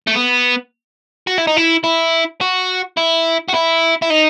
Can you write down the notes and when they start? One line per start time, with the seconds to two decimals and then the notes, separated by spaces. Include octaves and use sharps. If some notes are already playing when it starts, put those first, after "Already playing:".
0.07 A3
0.15 B3
1.27 F#4
1.38 E4
1.47 D#4
1.57 E4
1.84 E4
2.41 F#4
2.97 E4
3.48 F#4
3.54 E4
4.02 E4
4.10 D#4